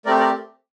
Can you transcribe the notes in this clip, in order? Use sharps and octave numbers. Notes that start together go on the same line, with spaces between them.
A3 C4 G4 A#4 D5
A#4 D5